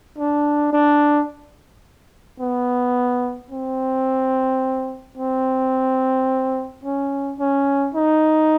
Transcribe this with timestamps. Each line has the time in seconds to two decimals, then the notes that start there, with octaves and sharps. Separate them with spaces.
0.18 D4
0.73 D4
2.40 B3
3.51 C4
5.18 C4
6.84 C#4
7.39 C#4
7.95 D#4